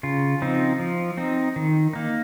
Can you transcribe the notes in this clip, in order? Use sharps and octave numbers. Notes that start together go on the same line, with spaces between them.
C#3 F4
F3 C4 D#4
F3
C4 D#4
D#3
A#3 D#4